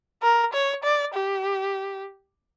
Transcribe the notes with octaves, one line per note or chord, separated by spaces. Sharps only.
A#4
C#5
D5
G4